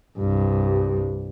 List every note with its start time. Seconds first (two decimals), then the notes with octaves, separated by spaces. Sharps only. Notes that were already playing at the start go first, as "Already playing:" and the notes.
0.19 C2 G2